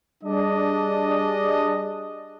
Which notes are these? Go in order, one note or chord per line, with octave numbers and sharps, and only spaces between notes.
G3 D4 G#4 D#5